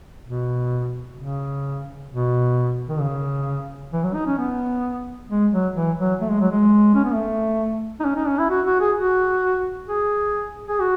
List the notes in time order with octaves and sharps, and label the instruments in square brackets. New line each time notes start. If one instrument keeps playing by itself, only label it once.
[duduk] B2
C#3
B2
D#3
C#3
E3
F#3
D#4
C#4
B3
G#3
F#3
E3
F#3
A3
G#3
F#3
G#3
C#4
B3
A3
D#4
C#4
D#4
C#4
E4
F#4
F#4
G#4
F#4
G#4
G#4
F#4